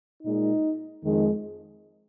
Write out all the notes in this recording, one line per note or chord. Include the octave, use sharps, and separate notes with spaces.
A#2 G#3 D#4
F2 D#3 G#3